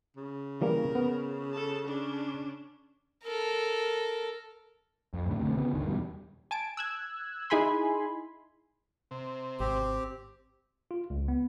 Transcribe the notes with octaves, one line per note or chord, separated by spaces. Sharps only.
C#3
E3 G3 A#3 A#4
B3
A4 A5
C#4 D4
A4 A#4
F2
F#2 A2 D3
B1 D3 A3 C4
C#3 B3
G1 D2 D3 D#3
E2 B2 G3
G#5 A5 D7
E6 F#6 G#6
D#4 E4 G#4 G#5 B5 C6
C3
G#1 C4 G4
F4
C#2
B3